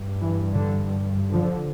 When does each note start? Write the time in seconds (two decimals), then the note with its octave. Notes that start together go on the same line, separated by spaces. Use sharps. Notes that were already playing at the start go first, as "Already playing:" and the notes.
Already playing: G2
0.22 E3
0.54 D3
1.32 D3 F3